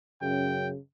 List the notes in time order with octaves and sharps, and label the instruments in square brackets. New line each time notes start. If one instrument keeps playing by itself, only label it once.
[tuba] F#2 [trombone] C#3 [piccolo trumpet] G5